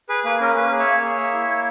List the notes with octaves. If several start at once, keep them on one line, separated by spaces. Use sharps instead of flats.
G#4 B4
A#3 B4
C#4 A#4
A#3 B4
G#4
C#5 E5
A#3
G#4
A#3
E4
A#3